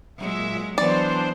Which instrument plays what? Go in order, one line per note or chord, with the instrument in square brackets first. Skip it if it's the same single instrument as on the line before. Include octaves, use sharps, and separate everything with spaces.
[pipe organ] A#2 E5 [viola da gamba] F#3 G#3
[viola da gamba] E3 F#3 B3 [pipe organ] D4 C5 [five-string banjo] D5